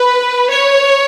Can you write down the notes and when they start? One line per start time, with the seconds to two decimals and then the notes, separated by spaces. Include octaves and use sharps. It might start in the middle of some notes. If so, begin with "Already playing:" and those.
Already playing: B4
0.48 C#5